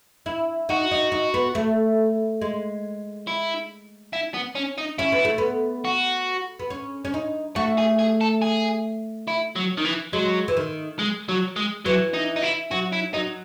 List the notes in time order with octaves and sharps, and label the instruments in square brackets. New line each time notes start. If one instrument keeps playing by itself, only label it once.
[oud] E4
[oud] D#4 [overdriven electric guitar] F#4
[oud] D#4
D#4
B3
A3
G#3
[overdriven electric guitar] E4
E4
B3
C#4
D#4
[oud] C#4 [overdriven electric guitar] E4
[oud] B3
A3
B3
[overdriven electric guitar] F#4
[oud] B3
C#4
C#4
D#4
[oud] A3 [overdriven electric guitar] F#4
[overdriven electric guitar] G#4
G#4
A4
G#4
E4
F#3
D#3
E3
[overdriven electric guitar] F#3 [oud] G#3
[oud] E3
D#3
[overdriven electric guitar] G#3
F#3
G#3
[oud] E3 [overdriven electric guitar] F#3
[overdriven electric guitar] D#4
D#4
E4
[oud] F#3 [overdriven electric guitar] F#4
[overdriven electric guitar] E4
[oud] F#3 [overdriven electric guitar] D#4